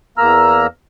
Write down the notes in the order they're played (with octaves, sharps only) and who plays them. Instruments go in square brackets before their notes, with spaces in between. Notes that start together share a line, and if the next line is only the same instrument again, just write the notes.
[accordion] E2 A#3 A#5 E6 F6